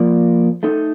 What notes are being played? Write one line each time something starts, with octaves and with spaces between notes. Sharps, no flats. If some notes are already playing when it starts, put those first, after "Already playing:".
Already playing: F3 A#3 F4 A#4 D5
A3 D#4 A4